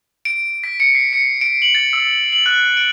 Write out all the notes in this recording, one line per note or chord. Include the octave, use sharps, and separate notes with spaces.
D7
B6
C#7
C7
C#7
D7
F#7
A6
E6
F#7
F#6
D7